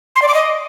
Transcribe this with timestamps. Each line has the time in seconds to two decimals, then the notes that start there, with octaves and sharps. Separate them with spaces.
0.15 C6
0.22 D5
0.28 D6
0.34 D#5